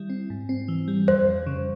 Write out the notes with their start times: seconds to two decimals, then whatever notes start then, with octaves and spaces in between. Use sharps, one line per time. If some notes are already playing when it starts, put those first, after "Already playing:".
Already playing: D#3 G3 E4
0.10 C4
0.30 G#2
0.49 C4
0.68 E3
0.88 G3
1.08 F2 C5
1.27 F2
1.46 C#3